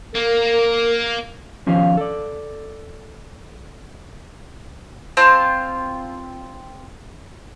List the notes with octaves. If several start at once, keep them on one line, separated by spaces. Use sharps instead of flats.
A#3 A#4
D#3 F3 C#4 G4 F5
A4 D5
C4 F4 F5 A5